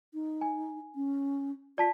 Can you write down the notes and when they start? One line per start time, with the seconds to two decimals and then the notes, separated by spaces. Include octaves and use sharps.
0.14 D#4
0.41 G#5
0.95 C#4
1.78 F4 D5 A5 B6